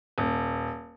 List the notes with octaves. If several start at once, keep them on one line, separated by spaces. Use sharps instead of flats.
D#1